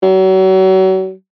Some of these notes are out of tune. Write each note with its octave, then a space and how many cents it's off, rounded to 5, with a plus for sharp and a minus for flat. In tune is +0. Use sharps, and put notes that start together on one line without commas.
F#3 +35